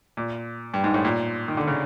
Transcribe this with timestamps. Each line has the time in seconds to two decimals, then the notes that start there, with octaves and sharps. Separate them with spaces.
0.17 A#2
0.74 G2
0.84 G#2
0.94 A2
1.05 A#2
1.48 D#3
1.57 D3
1.67 C#3